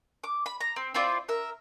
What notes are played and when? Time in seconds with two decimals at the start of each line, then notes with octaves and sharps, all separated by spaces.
0.24 D6
0.46 B5
0.60 A#5
0.76 C4
0.94 C4 E4 F4 D5
1.29 A#4 E5